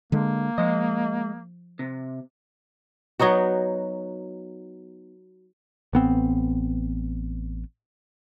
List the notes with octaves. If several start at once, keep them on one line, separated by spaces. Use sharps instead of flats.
D3 G#3 A#3
F3 G#3 D#5
C3
F#3 B3 D#4 F#4
A1 B3 C4